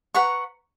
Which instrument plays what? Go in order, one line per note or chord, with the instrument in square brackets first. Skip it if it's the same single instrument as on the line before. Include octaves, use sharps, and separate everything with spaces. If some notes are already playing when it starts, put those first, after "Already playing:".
[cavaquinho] B4 F#5 A#5 C#6